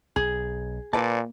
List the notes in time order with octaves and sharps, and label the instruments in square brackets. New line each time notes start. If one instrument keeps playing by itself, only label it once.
[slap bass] B1 [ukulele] G#4
[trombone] A#2 [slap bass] A#3 [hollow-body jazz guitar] B4 D5 A5